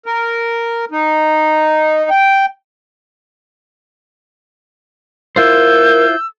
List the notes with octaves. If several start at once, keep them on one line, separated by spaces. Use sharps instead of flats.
A#4
D#4
G5
E4 F4 A#4 C5 E6 G6